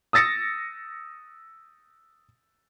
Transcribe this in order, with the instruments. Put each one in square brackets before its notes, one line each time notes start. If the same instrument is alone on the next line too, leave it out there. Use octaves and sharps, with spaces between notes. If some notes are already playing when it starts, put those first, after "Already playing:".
[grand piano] D#6 E6 A6 A#6 C#7